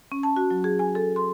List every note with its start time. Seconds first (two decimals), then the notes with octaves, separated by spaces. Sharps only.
0.12 C#4
0.23 A5
0.36 F#4
0.51 F#3
0.64 G#4
0.79 G#5
0.95 A4
1.16 C6